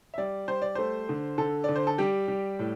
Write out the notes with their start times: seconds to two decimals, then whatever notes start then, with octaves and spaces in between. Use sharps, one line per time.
0.14 E5
0.18 G3 D5
0.48 G3 C5
0.62 D5
0.75 A3 C5
1.09 D3
1.38 D3 A4
1.64 D3 D5
1.76 C5
1.87 A4
1.98 G3 G4
2.28 G3
2.59 A2